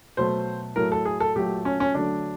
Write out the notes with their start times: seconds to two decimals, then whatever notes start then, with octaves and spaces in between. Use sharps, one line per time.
0.17 B2 F#3 A3 C5
0.76 A2 F#3 A3 A#4
0.92 A4
1.05 G#4
1.20 A4
1.36 A#2 F#3 A3 G4
1.65 C#4
1.80 C#4
1.94 D3 F#3 A3 D4